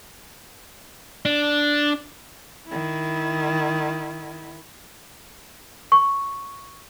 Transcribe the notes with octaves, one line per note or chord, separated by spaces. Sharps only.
D4
D#3 E4
C#6